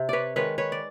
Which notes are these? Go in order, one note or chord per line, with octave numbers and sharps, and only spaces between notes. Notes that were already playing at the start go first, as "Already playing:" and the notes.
Already playing: C3
B4 C#5 D5
D#3 G#3 B4 C#5
B4 C#5
D5